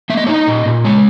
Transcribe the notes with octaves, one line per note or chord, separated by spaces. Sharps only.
A#3 E5
D#5
D#4 C#5
D#5
A#2
A#2
G#3 C#5